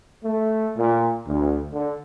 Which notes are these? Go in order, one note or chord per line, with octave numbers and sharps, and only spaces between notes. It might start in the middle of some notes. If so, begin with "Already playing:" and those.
A3
A#2
D2
D3